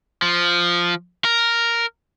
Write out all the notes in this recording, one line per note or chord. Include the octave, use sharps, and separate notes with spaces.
F3
A#4